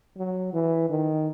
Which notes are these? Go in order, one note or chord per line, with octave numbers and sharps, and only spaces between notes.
F#3
E3
D#3